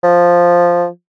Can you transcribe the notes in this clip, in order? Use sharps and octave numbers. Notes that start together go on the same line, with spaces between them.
F3